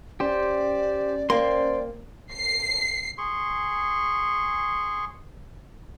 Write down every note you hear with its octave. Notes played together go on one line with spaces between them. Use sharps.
C#4 G4 C5 D5
A#3 C5 D5 G5 C6
C7
G#4 C6 C#6